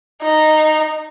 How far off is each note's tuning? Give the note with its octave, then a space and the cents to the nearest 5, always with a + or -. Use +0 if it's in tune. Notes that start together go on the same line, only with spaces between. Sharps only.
D#4 -10